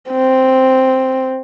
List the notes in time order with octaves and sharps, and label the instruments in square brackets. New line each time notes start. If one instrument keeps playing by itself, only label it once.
[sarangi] C4